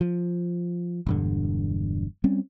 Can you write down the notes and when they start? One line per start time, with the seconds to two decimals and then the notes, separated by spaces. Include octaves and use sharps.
0.01 F3
1.07 E1 G2 D3
2.24 G3 C4 C#4